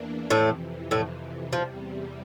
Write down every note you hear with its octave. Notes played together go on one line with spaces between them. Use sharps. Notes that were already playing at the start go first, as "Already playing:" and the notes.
Already playing: E2 E3 A#3 D4
F2 A2 C3 E3 A3
A2 A3
E2 C3 F3 G3